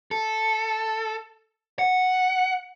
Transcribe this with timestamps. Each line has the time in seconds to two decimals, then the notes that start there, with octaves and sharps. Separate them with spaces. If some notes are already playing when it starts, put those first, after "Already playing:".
0.11 A4
1.79 F#5